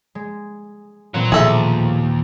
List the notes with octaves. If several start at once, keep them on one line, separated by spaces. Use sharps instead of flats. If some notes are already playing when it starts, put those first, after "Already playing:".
G#3
A#2 E3 F#3 C4
D#2 B2 F3 G#4 A4 E5